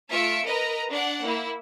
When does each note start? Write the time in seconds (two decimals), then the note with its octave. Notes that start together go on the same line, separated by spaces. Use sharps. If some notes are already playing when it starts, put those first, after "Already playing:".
0.12 A3 F4 E5 F5 C#7 D7
0.45 A#4 B4 D#5 A#5
0.91 D4 D5 F#5
1.24 A#3 E4